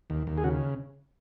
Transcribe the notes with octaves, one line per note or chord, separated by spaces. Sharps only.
D#2
D#2
G#4
C#3 F#4